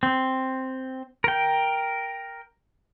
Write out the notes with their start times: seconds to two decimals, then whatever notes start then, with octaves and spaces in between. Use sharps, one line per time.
0.03 C4
1.24 A#4 G5